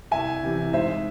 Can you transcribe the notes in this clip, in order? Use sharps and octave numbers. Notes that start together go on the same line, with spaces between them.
C2 E5 G#5
C3 E3
G#2 C5 E5